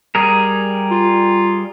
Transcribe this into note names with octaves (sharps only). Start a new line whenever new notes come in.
G3 G#4 A#4
F4